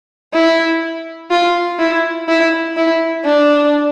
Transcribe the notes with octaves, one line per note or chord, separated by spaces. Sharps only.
E4
F4
E4
E4
E4
D4